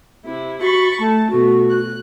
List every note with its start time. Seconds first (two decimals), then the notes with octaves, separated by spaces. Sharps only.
0.25 C3 E4
0.61 F#4 B5 C#6 A6
0.99 A3 A5
1.30 B2 A3 F#4
1.69 F#6